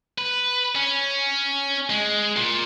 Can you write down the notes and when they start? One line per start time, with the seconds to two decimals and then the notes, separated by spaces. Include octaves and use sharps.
0.18 B4
0.75 C#4
1.90 G#3
2.37 A#2